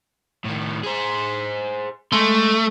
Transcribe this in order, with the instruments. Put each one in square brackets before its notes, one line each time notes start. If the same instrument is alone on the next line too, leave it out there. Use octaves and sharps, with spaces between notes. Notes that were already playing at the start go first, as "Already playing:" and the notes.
[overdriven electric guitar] A2 D#3
G#4 C5
[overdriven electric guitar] G#3 C6 [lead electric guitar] A3